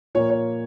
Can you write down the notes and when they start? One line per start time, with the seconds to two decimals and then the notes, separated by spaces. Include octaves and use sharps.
0.15 A#2 F3 A#3 C#5
0.30 C#5